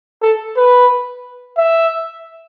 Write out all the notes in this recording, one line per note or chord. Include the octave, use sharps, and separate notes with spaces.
A4
B4
E5